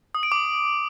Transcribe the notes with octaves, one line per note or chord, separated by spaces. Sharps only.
D#6
D7
D6